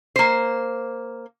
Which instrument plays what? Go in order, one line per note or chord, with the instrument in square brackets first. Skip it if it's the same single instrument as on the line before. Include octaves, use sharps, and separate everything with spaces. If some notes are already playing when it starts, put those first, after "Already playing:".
[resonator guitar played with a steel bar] A#3 C5